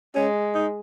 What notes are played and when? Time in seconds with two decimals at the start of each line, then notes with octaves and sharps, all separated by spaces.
0.15 G#3 C#4
0.55 D#4